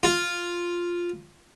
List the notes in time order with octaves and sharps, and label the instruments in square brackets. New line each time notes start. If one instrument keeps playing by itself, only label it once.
[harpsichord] F4